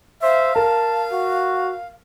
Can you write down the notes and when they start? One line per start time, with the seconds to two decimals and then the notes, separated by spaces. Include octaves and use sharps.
0.22 C5 E5 F5
0.56 A#4 A5
1.12 F#4